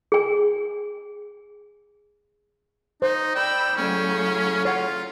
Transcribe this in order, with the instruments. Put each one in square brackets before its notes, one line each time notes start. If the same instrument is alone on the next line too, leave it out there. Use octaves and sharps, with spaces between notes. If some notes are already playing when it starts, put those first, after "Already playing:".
[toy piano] G#4 G#5
[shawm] D#4 [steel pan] C5
[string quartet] D5 B5 E6 [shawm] G5
[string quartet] A2 C#3 F#3 [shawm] C#4
[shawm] F4 [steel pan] C#5 F#5